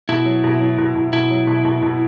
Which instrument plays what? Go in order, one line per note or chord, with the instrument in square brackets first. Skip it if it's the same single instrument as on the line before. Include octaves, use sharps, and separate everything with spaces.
[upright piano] B2 [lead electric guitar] E4
[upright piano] F#3
B2
F#3
B2
B2
[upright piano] B2 [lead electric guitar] E4
[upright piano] F#3
B2
B2
B2